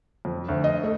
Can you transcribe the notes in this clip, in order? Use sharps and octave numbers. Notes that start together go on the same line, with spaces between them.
F2
D2
D#5
A3